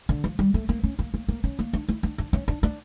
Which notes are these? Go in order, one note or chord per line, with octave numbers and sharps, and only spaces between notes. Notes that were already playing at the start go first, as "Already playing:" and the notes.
D3
F3
G3
A3
A#3
C#4
A#3
A#3
A#3
C#4
A#3
D4
E4
D4
D4
C#4
D4
D4